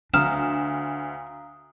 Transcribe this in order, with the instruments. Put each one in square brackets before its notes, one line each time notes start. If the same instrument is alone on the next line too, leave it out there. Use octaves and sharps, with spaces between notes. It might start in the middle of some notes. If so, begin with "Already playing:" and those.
[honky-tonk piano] D2 [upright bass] D4 [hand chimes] F5 A#5 D#6 [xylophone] F6 E7